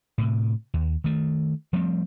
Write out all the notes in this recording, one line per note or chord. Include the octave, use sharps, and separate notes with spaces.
A2 C3
D#2
D#3 A3
F3 G3 A3 C4